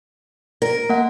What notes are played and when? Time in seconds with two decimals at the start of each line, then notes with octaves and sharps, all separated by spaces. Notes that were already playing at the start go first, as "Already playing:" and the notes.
0.62 A#4
0.89 A#3 F#5